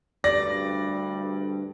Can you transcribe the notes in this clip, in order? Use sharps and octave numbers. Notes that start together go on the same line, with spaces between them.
D2 G2 D5 A#6